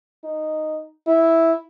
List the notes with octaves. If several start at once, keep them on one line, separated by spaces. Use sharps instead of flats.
D#4
E4